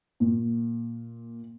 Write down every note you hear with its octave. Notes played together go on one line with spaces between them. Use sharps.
A#2